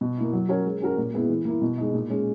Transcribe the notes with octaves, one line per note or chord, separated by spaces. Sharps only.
B2
A#3 E4
F#3
C#4 F#4 A#4 C#5
G#3
C#4 F#4 A#4
A#2
G#3 B3 E4
E3
A#3 E4
B2
G#3 D#4
A#2
G#3 C#4